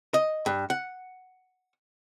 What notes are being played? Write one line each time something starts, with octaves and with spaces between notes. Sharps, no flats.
D#5
G2
F#5